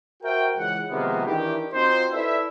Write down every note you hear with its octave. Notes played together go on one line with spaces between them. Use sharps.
F#4 A#4 C5 E5 G5
C#2 E3 F#5
C3 D#3 F3 G#3 A#3 B3
D#3 E3 D4 E4 G4
C4 D#4 F4 F#4 C5
E4 A4 B4 D5 E5